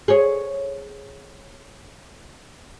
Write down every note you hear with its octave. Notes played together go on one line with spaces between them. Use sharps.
G#4 C#5